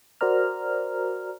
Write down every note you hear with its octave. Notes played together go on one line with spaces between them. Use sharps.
F#4 A#4 C5 D5 A#5 F6